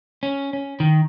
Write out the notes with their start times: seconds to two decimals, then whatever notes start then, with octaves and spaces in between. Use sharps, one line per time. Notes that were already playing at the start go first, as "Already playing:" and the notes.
0.23 C#4
0.53 C#4
0.80 D#3